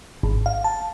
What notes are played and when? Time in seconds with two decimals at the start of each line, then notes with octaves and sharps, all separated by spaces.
0.23 G#1
0.46 F5
0.64 A5